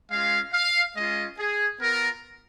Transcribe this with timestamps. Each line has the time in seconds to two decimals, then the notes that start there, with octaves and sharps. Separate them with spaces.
0.11 G#3 C#4 F4 F5
0.53 F5
0.96 G#3 C#4 F4 D#5
1.38 G#4
1.80 B3 F4 A#4